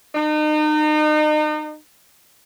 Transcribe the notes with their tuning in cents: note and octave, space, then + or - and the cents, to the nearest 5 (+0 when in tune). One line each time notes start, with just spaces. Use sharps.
D#4 -35